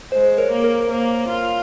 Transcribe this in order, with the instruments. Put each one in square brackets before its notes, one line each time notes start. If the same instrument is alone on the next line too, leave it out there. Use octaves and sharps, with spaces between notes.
[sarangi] G#3 [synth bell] C5
[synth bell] A#4 C#5
[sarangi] A#3
[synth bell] A#4
[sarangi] A#3 [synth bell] A#4
[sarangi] F4